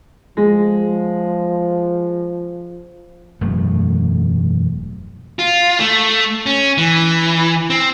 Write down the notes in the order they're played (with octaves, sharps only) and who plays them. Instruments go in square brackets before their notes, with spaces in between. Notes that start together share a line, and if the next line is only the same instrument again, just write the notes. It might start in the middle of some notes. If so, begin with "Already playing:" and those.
[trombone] F3 [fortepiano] G#3
[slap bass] E1 F#2 A2 A3
[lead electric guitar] F4
A3
C#4
E3
C4